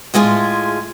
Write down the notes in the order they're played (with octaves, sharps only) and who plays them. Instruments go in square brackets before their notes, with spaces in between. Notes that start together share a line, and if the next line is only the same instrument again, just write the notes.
[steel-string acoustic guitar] A2 G#3 F4 G#4 E5